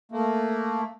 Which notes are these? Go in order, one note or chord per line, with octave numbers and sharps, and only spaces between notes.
A3 A#3